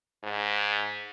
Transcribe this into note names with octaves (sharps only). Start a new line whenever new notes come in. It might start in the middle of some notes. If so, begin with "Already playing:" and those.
G#2